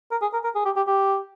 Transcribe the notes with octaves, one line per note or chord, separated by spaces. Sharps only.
A#4
G#4
A#4
A#4
G#4
G4
G4
G4